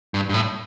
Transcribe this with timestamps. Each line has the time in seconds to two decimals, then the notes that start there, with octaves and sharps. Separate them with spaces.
0.14 G2
0.29 G2
0.34 A2